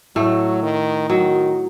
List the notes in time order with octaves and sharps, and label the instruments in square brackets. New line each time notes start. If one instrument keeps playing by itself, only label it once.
[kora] A2 A3 [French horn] F#3
[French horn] D#3
[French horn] D#3 [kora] F#3